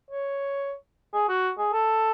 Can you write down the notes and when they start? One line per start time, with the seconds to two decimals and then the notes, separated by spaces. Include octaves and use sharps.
0.11 C#5
1.14 G#4
1.28 F#4
1.58 G#4
1.73 A4